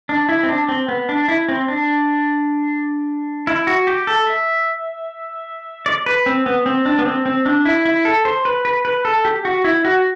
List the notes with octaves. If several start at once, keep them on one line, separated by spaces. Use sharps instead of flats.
D4
E4
C4
D4
C4
B3
D4
E4
C4
D4
E4
F#4
G4
A4
E5
D5
B4
C4
B3
C4
D4
B3
C4
C4
D4
E4
E4
A4
C5
B4
B4
B4
A4
G4
F#4
E4
F#4